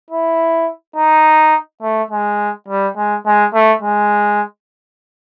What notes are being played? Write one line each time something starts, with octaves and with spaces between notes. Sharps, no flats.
E4
D#4
A3
G#3
G3
G#3
G#3
A3
G#3